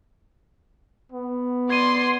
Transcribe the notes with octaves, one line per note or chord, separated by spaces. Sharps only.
B3
D5 C6 G#6 D#7